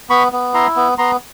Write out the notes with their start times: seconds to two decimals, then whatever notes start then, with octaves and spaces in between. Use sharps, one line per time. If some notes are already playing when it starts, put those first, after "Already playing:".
0.10 B3 B5 C#6
0.32 B3
0.54 E4 A#5 C6
0.76 B3
0.98 B3 A#5 C6